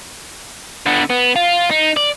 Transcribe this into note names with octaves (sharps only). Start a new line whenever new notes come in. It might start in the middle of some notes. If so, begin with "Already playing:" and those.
D3 B3
B3
F4
D#4
D5